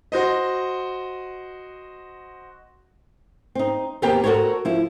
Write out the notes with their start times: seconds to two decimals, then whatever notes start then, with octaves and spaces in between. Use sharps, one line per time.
0.12 F#4 C5 D#5
3.55 C4 D#4
4.02 D#2 B3 C4 G4 A#4 G5
4.24 F#4 A4 A#4 C5 C#5
4.65 F3 E4